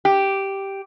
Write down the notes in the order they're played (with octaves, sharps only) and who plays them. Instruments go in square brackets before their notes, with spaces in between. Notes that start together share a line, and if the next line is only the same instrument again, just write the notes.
[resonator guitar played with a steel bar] G4